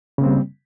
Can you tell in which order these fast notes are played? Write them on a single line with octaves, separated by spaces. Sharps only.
C#3 A#3 C4 G3